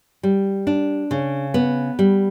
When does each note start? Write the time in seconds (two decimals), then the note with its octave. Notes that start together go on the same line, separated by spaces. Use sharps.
0.23 G3
0.67 D4
1.11 C#3
1.54 B3
1.99 G3